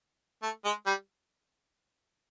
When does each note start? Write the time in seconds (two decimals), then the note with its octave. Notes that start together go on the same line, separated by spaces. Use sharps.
0.42 A3
0.65 G#3
0.86 G3